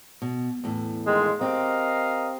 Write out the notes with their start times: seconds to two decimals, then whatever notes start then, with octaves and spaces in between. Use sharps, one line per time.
0.22 B2
0.64 E2 A2
1.06 D#3 G#3 F4
1.41 C4 G4 A#4 D#5 F5